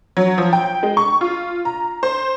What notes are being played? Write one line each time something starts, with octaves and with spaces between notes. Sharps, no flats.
F#3
F3
G5
G#3
C#6
F4
A#5
C5